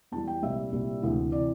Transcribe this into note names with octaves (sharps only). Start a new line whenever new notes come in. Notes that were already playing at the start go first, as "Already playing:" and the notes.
E2 E3 G3 A5
G5
C2 A#2 G3 E5
C2 A#2 G3
D2 C3 E3
C3 E3 D5